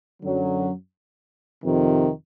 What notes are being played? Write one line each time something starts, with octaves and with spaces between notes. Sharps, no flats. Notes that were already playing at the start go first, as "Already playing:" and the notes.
F#2 D3 F#3
F2 C3 D#3